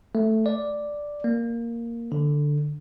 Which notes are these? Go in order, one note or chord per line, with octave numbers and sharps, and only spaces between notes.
A3
D5
A#3
D3